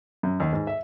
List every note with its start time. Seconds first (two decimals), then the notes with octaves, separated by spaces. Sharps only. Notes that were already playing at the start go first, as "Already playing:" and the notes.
0.23 F#2
0.40 D#2
0.53 G#2
0.67 E5